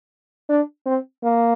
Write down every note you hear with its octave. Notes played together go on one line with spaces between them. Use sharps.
D4
C4
A#3